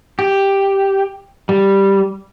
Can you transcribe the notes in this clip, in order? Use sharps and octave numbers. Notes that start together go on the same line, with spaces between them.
G4
G3